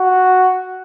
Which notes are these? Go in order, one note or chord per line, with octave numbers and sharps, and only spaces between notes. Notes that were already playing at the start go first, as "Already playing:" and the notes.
Already playing: F#4